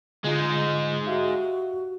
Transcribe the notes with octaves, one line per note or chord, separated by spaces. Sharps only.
D3 G#3 D#4 F4 A#5
F#4 G4 E5 F5